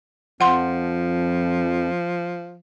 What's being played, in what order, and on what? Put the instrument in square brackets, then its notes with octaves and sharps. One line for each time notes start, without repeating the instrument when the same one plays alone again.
[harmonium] F2 [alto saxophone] F3 [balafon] F#5 C6